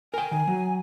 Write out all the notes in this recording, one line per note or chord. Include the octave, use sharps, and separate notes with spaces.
A#4 G5 G#5
D#3
F#3